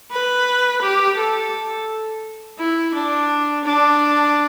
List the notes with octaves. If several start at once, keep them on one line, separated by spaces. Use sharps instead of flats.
B4
G4
A4
E4
D4
D4